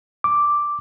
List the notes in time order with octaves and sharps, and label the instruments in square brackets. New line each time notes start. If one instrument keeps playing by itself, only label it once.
[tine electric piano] D6